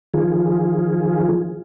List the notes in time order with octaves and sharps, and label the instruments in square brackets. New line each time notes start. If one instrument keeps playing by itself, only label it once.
[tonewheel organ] D#3 F3 F4 G#4